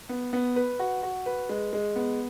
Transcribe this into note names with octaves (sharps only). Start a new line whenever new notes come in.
B3
B3
B4
F#4
F#4
B4
G#3
G#3
B3